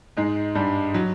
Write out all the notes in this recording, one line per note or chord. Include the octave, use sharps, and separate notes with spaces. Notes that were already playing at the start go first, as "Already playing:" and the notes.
G#2 G#3
G2 G3
F#3